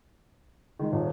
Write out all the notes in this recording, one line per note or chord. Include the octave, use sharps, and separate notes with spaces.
D#3 G#3
D#1